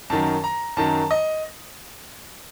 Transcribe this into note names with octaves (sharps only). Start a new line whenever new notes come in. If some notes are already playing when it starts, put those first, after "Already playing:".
F#2 D#3 F#3 A5
A#5
F#2 D#3 F#3 A5
D#5